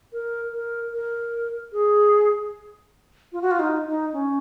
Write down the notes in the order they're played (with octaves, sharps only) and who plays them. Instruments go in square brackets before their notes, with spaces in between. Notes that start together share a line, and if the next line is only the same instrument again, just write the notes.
[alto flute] A#4
A#4
A#4
G#4
F4
F#4
F4
D#4
D#4
C#4